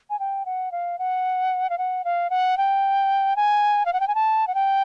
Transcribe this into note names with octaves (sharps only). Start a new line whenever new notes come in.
G#5
G5
F#5
F5
F#5
F5
F#5
F5
F#5
G5
G#5
F5
F#5
G5
G#5
A5
F#5
G5